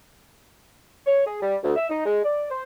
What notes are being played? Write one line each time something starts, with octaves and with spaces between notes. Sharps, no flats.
C#5
G#4
G3
D2
E5
D#4
G#3
D5
C5